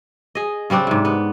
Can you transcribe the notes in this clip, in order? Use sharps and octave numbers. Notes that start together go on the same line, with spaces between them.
G#4 D#5
C#3 G3 C4 D4
G#2 C3
B3